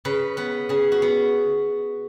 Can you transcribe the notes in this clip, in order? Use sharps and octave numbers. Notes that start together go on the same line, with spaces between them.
C#3 B4
B3 B4
C#3 G#4
F#4
B3